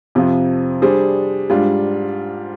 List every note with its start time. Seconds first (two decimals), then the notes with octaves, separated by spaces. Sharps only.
0.15 F2 C3 F3
0.82 G3 D4 G#4 C5
1.50 G#2 G3 D4 F4